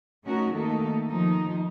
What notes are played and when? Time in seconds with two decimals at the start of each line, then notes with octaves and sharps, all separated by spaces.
0.24 A3 C#4 D#4 F#4 A#4
0.53 D#3 A3 A#3 D#4 A4
1.09 D#3 F3 D#4